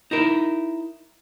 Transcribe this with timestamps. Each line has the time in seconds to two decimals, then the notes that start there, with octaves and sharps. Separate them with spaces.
0.11 D#4 E4 A#4